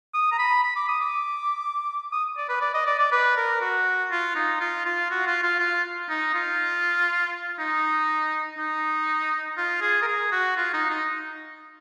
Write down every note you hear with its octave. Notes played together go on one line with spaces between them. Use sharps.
D#6
A#5
B5
B5
D6
D#6
D6
D#6
D5
B4
D5
D#5
D5
D5
B4
A#4
F#4
F4
D#4
F4
F4
F#4
F4
F4
F4
D#4
F4
D#4
D#4
F4
G#4
A#4
G#4
F#4
F4
D#4
D#4